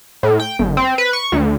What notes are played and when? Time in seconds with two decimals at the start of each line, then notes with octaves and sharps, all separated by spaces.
0.23 A2
0.40 G5
0.59 G1
0.77 C4
0.98 B4
1.13 C#6
1.32 D2